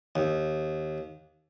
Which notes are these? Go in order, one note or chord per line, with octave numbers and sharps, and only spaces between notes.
D#2